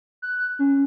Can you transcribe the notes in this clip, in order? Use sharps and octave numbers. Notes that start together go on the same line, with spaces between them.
F#6
C#4